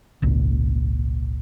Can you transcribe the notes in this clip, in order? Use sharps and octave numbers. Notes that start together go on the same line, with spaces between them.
G#1 C#2 A#2